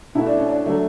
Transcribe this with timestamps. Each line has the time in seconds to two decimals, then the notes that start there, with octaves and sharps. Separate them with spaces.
0.15 B2 A3 E4
0.26 D4
0.38 C#4
0.49 D4
0.65 D3 F#3 A3